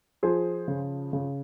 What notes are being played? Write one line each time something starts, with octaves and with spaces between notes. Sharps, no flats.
F3 G#4 C5
C#3
C#3